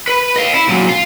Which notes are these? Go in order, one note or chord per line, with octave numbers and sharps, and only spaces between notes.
B4
D#5 F5
E4
A#2 F#3
F4